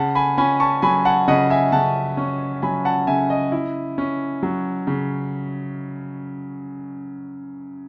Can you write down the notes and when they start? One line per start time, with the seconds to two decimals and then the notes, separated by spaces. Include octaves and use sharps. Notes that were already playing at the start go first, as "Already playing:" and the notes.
Already playing: C#3 F#5 A5
0.15 G#5 B5
0.38 C#4 G#5 B5
0.60 A5 C#6
0.82 F#3 G#5 B5
1.05 F#5 A5
1.28 C#3 D#5 F#5
1.50 E5 G#5
1.72 C#3 F#5 A5
2.17 C#4
2.62 F#3 G#5 B5
2.85 F#5 A5
3.07 C#3 E5 G#5
3.30 D#5
3.52 E4
3.98 C#4
4.43 F#3
4.87 C#3